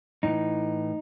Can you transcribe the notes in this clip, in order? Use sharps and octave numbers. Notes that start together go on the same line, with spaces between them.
A2 E3 D#4